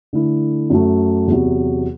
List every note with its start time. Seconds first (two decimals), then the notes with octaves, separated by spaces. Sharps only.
0.13 D3 A3 E4
0.70 F#2 F#3 A3
1.27 E2 C3 F#3